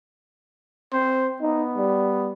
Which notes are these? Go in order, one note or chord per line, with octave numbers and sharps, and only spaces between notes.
C4 C5
B3 D#4
G3